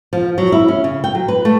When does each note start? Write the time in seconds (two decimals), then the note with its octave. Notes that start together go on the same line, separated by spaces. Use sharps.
0.13 F3
0.38 F#3
0.52 E4
0.68 C#4
0.84 C#3
1.04 G5
1.15 F#3
1.28 B4
1.45 A3